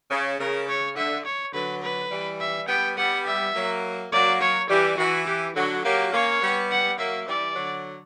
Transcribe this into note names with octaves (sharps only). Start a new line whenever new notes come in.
C#3
C#3 A#4
C#5
D3 E5
C#5
D3 F#3 B4
B4
E3 G3
E5
G3 B3 G5
G3 B3 F#5
E5
F#3 A#3
F#3 A#3 D5
C#5
E3 G3 G4
E3 F#4
G4
D3 F#3 F#4
F#3 A#3 G4
A#3 C#4 C#5
G3 B3
F#5
F#3 A#3 E5
E3 G3 D5
D3 F#3